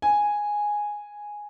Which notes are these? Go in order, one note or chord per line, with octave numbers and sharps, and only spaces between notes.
G#5